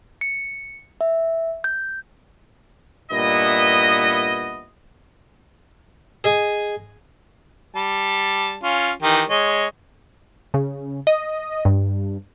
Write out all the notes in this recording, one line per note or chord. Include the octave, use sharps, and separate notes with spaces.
C#7
E5
G6
G2 A#2 B3 E4 D#5
G#4 D#5 G#5
G3 A5
C#4 F4
D#3 E3 G4
G#3 C#5 D#5
C#3
D#5
G2